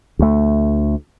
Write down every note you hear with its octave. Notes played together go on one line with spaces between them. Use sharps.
D2 A3